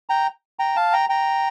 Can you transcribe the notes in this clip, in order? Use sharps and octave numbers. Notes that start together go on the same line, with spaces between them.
G5 A#5
G5 A#5
F5 A5
G5 A#5
G5 A#5